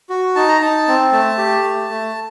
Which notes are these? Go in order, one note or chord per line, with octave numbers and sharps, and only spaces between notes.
F#4
D#4 A5
A#5
D#4 A5
C4
A3 A5
G4
A3
A3